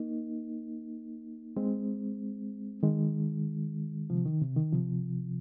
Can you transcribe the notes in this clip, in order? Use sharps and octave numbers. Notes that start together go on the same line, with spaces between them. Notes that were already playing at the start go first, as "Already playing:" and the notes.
Already playing: A#3 D#4
G#3 C4
D#3 G#3
C3 F3
D#3
C3
D#3
C3 F3